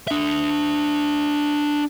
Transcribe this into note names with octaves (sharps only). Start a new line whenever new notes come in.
D4 E5